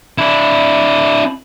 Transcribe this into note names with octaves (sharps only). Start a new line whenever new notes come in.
D4 E4